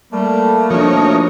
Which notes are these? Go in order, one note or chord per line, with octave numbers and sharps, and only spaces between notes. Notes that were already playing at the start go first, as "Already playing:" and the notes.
G3 A3 A#3
F3 D4 D#4 F#4 A#4 C#5